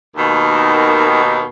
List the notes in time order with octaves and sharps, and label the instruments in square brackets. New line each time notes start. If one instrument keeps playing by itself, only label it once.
[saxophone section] D#2 B2 D#3